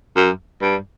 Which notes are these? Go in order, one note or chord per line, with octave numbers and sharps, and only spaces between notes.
F#2
G2